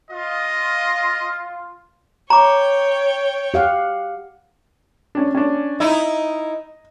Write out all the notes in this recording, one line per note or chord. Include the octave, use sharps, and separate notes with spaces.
F4 D#5
C#5 G5 A#5 D6
G4 F5 F#5
C#4 D4
C#4 D4
D#4 E4 D#5